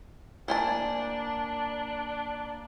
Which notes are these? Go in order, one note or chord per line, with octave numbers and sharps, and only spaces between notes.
A#3 D4 C5 G#5 A5 D6